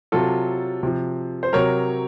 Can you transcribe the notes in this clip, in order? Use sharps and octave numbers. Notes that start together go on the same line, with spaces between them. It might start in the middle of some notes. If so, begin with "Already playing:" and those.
C3 F#3 F4 A4
C3 F3
C5
C3 F#3 A#4 C#5